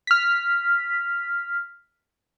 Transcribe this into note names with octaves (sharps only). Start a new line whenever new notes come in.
F6 B6